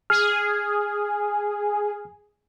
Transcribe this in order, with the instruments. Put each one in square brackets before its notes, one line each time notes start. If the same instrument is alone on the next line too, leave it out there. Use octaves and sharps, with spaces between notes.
[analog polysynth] G#4 [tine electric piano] F6